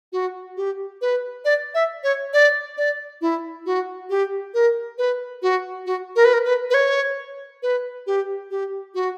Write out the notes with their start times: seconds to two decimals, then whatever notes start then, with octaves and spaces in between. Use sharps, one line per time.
0.12 F#4
0.57 G4
1.01 B4
1.45 D5
1.74 E5
2.04 C#5
2.33 D5
2.78 D5
3.21 E4
3.66 F#4
4.10 G4
4.54 A#4
4.98 B4
5.42 F#4
5.86 F#4
6.16 A#4
6.25 B4
6.33 A#4
6.45 B4
6.70 B4
6.74 C#5
7.63 B4
8.07 G4
8.51 G4
8.95 F#4